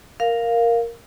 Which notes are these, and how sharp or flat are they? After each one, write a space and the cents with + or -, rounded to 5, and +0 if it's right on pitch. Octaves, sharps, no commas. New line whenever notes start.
A#4 +0 F5 +0